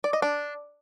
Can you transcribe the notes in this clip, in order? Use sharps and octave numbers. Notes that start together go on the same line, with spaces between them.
D5
D#5
D4